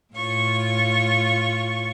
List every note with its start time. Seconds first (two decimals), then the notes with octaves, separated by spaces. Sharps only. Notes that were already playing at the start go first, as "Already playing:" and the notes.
0.14 A2 F4 C#5 C#6